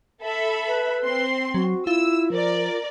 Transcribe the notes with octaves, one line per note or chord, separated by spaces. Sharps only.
A4 E5 B5
B4
C4 C6
F#3 F#4
E4 F4 E6
F3 A#4 D5